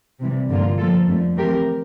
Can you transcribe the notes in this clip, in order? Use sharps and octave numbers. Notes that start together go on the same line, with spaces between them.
C3 E3 G3
G2 D3 F3 A#3 F4
F3 A#3 F4 A4
F2 D3 A3
E3 A3 C4 G4 A#4